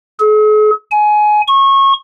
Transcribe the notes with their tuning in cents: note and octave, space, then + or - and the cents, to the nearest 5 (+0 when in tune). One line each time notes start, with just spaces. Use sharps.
G#4 +45
G#5 +20
C#6 -25